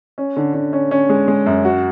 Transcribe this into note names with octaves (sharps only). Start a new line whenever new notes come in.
C#4
D3
D3
C#4
C#4
G#3
G#3
F#2
F#4